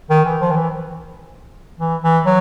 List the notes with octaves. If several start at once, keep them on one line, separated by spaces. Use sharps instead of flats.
D#3
E3
F3
D#3
E3
E3
E3
F#3